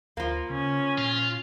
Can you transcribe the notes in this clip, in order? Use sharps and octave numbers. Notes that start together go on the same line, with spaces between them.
D2 F3 A#3
C#3 C#4
A#2 F4